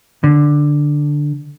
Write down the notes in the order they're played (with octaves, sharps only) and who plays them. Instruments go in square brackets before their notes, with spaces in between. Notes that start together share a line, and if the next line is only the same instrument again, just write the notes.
[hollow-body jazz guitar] D3